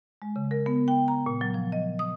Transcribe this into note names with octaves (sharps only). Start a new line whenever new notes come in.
G#3
C#3
A#4
B3
G5
A#5
A#2
F#3
F3
D#5
D#6